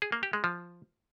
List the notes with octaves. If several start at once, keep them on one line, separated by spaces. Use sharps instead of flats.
G#4
A#3
G4
G#3
F3